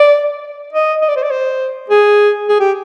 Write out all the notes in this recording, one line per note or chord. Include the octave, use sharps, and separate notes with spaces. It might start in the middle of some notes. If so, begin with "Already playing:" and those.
Already playing: D5
D#5
D#5
D5
C5
D5
C5
G#4
G#4
G4